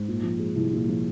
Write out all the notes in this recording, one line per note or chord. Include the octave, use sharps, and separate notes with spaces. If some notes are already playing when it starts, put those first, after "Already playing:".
Already playing: G#2
A#2
F3
G#3
C2
A#2
F3